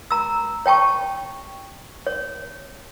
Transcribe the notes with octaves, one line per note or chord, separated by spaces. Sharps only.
A#5 E6
C#5 G5 A5 C#6
C#5